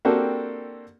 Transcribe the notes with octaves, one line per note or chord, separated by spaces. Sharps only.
A#3 C4 D4 F#4 G4 A4